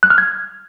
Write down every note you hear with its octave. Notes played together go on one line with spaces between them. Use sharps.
F#6
F6
G#6